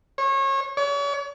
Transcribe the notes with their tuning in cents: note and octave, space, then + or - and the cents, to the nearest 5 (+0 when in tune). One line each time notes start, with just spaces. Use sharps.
C#5 -30
C#5 +40